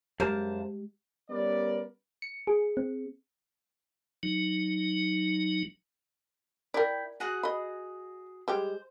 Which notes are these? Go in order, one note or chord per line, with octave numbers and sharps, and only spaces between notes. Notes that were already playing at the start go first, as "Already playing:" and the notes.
F#2 G#3 A#3 G4 C5 A5
G3 B3 C#4 A#4 B4 D5
C#7
G#4
C4
F#3 D#4
E4 A#4 D5 G5
F#4 G#4 F#5
D#5 B5
G3 G#3 G4 C5